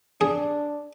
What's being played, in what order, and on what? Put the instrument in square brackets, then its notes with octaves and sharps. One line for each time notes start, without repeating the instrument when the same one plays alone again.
[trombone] D4 [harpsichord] G#4